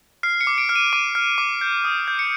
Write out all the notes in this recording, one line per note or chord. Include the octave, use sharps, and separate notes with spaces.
F6 C7
C#7
D6
D7
F6
D#7
D6 D#7
F6
D6
G6
D#6
G6
C#7